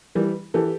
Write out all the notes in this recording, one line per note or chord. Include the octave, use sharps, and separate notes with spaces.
E3 G3
E3 G4 A4